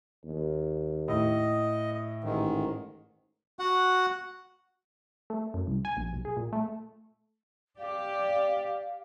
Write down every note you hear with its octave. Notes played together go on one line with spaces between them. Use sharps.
D#2
A2 D#5
A1 G#2 D#3
F#4 F#5
A3
F#2
C2
G#5
A#1
B1
G#4
A#2
A3
G4 D5 F5